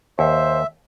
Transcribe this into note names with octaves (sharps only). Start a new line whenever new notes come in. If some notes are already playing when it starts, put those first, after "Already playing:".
D#2 C5 E5